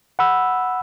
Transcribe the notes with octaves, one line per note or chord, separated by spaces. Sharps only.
F#5 B5 E6